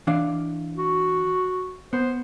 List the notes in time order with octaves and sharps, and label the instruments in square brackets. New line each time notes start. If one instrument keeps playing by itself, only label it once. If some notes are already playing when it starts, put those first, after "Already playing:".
[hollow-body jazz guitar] E3 D4 F5
[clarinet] F#4
[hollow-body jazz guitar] B3 [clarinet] C5